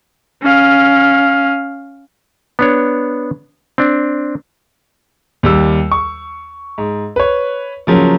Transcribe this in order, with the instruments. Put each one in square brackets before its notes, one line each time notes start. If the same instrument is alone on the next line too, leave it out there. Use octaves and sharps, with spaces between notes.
[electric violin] C#4 F5
[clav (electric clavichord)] B3 D4 C#5
C4 D4
[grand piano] D#2 G3 E6
C#6
G#2
B4 C#5
C#3 F3 F#3 A#3